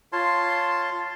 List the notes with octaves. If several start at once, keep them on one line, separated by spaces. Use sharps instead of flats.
F4 C#5 A5 C6